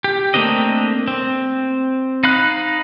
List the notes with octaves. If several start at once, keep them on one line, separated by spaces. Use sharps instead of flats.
G4
A3 A#3 C4 D4 D#5
C4
D#4 F5 B5 F#6